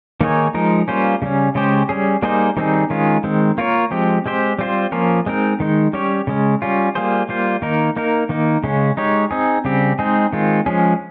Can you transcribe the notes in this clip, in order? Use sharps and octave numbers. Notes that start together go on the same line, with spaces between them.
D#3 A#3 D#4 G#4 C#5
F3 G#3 D#4 A#4
G3 A#3 C#4 F4 C5
C#3 G3 C#4
C#3 G#3 C#4 G4 C5
G3 C#4 G#4
G3 A#3 D#4 G#4 C5
D#3 G3 C4 D#4 G#4
D#3 G#3 C#4 F4
D#3 G#3 C4
A#3 F4 A#4 C#5
F3 G#3 C4 G4
G#3 C4 G4 C5
G3 C4 F4 C5
F3 A#3 C#4 F4 A#4
G#3 C4 D#4 A#4
D#3 G#3 D#4
G3 C#4 G4 C#5
C#3 G#3 C#4
G3 C#4 F4
G3 A#3 F4 G#4 C5
G3 A#3 F4 C5
D#3 A#3 D#4 A#4
A#3 D#4 A#4
D#3 A#3 D#4
C#3 G#3 C#4
G#3 D#4 G4 C#5
C4 D#4 G#4
C#3 G3 C4 G4
G#3 C4 D#4 G#4
D#3 G#3 C4 F4
F3 G#3 C#4 G#4